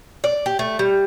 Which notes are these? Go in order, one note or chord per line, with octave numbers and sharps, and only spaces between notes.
D5
G4
A3
G3